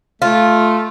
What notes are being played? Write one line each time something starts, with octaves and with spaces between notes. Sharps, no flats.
A3 F4